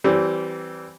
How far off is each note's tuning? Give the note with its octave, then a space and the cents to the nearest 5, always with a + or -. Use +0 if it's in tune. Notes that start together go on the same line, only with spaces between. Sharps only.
E3 +0 G3 -25 C4 +0